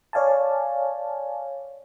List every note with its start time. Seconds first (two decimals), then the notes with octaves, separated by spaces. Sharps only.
0.13 C#5 D5 F5 G#5 A5